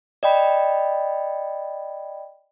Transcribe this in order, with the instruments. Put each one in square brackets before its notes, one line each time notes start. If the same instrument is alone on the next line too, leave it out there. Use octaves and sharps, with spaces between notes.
[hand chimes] D5 D#5 G5 B5